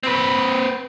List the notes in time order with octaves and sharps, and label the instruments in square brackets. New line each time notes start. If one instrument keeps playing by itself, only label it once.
[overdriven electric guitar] C4 B4